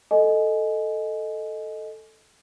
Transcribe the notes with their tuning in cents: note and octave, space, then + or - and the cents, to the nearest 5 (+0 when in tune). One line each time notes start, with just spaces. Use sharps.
A4 +0 D#5 +0 G#5 +20